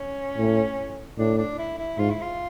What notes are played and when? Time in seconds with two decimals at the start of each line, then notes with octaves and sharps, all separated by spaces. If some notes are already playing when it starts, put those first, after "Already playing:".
Already playing: C#4
0.38 A2
1.19 A2 D4
1.38 D4
1.58 E4
1.78 E4
1.98 G#2 F4
2.10 E4
2.21 F4